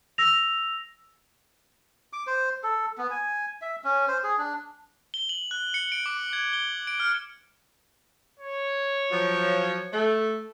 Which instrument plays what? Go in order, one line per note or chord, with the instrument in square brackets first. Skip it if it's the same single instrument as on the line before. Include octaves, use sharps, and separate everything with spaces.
[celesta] E6 A#6 F7
[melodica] D6
C5
A4
B3
G#5
E5
C#4
C5
G#4
D4
[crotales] G7
F#7
F#6
C#7
D7
D6
G#6
G7
D7
F6
[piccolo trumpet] C#5
[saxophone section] F3 F#3
A3